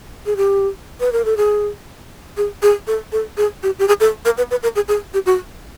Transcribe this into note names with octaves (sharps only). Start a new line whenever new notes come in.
G#4
G4
B4
A#4
A4
G#4
G#4
G#4
A4
A4
G#4
G4
G4
G#4
A4
A#4
B4
B4
A#4
G#4
G#4
G4
F#4